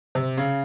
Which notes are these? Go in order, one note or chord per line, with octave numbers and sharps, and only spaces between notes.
C3
C#3